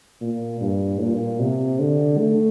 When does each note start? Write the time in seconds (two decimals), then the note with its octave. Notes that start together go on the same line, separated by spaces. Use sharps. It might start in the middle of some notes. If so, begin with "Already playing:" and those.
0.21 A#2
0.61 G2
1.00 A#2
1.40 C3
1.79 D3
2.19 A3